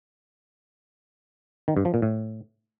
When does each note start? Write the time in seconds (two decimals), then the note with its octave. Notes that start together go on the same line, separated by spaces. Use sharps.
1.68 D#3
1.77 G2
1.85 F3
1.94 A#2
2.02 A2